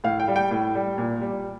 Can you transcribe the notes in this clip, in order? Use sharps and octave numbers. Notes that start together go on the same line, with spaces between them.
A2 F5
G5
G3
G5
A2
G3
A#2
G3